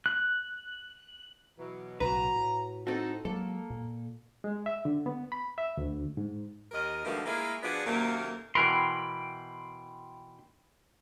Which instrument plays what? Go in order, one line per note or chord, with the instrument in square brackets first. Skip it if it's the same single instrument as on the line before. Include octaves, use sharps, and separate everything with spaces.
[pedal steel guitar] F#6
[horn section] B2 E3 F#3
[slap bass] B1 A2 C#3 [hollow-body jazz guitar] F#4 B4 [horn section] A#5
[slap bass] A2
[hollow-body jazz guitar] C4 F#4 [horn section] D#4 A4
[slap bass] F#3 G#3 [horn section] A#3 [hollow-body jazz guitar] A4
[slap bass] A#2
[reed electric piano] G#3
E5
D3
B3
B5
E5
D2
G#2
[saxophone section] D#2 A#4 D#5
B2 D3 D#3 F3 G#3 A3
G#3 A#3 E4 F4 G#4
F3 B3 D4 F#4 G#4 D5
F#2 C3 D#3 A3 A#3
[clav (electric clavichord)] B2 E3 A#4 [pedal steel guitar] G5 B5 C6